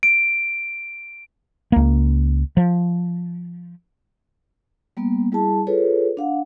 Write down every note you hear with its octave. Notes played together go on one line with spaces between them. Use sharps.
D7
C#2 A#3
F3
G3 A#3 B3
G3 E4 G#4 A5
F4 G#4 A4 B4 C#5
D4 F5 F#5